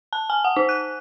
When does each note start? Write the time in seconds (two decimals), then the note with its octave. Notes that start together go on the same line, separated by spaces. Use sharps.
0.13 A5
0.30 G#5
0.44 F#5
0.56 D#4
0.69 F#6